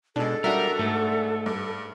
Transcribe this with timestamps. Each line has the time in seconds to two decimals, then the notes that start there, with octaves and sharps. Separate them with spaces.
0.16 B2 G#3 D4 A4
0.44 G3 D4 F#4 A#4 E5
0.79 G#2 A3
1.46 G2